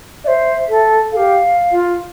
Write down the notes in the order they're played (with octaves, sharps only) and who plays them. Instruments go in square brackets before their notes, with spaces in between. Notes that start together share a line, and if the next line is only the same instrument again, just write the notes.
[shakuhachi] C5 D5 [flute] E5
[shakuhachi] A4
[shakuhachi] G4 A4 [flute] F5
[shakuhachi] F4